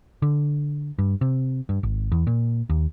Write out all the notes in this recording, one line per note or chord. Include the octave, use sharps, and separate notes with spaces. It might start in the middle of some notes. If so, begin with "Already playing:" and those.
D3
G2
C3
G2
G#1
E2
A#2
D#2